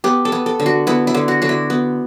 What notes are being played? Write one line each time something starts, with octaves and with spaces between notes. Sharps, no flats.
B3 G4
A4
B3
A4
D3
F#4
B3 E4
E4
D3
F#4
D3 F#4
E4
B3